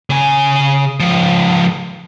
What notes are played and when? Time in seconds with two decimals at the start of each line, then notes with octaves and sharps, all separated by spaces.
0.10 C#3 G#5
1.00 C#2 F3